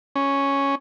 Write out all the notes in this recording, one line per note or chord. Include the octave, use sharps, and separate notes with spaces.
C#4